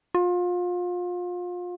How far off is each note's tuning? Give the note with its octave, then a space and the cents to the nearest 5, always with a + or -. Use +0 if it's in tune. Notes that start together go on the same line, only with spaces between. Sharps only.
F4 +30